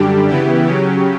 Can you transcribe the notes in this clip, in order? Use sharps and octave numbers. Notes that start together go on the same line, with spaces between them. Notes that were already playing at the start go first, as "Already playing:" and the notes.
Already playing: F#2 D3 G3 D4 G4
C#3 E3 B3 E4 G4
C#3 F#3 C#4 G4